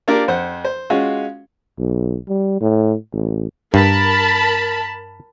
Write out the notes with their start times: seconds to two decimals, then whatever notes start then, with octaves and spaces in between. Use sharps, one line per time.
0.08 A#3 D4 F4 G4 A#4
0.28 F2 C5 F#5
0.65 C5
0.90 G#3 C#4 F4 F#4
1.79 B1
2.28 G3
2.61 A2
3.12 A1
3.74 G2 A#4 A5 B5